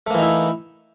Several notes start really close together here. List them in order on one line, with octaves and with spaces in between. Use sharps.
A3 A#3 E3 D#4 E4